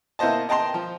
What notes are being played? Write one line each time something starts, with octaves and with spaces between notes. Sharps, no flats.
A#3 B3 E4 C5 D#5 A5
D#5 G5 A5 A#5 C6
F3